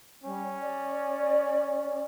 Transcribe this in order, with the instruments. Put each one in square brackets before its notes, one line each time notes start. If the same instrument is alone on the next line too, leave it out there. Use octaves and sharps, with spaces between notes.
[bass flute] G3 [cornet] C#4
[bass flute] D5